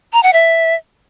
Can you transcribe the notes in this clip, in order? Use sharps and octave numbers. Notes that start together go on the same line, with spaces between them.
A#5
F#5
E5